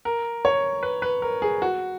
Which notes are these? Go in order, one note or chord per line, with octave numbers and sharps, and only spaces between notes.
A#4
C#5
B4
B4
A#4
G#4
F#4